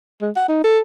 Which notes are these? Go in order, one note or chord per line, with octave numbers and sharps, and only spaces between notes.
G#3
F#5
D#4
A4